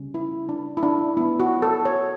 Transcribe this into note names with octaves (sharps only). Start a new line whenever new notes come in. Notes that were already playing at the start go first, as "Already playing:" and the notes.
Already playing: C#3 G3 C#4
E4
D4
E4
D4
E3 B3 E4
F#4
A4
C#5